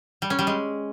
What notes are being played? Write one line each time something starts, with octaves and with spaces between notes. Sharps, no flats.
G3
C#4
G3
G#3